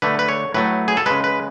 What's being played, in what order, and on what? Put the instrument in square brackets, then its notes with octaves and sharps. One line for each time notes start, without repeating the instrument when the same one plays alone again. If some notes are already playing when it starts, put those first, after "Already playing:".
[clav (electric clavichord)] D3 A3 B4
B4
C#5
A2 F#3 A3 B4
G#4
A4
C#3 G#3 B4
B4